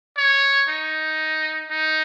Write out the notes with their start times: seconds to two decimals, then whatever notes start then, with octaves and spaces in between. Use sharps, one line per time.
0.17 C#5
0.69 D#4
1.71 D#4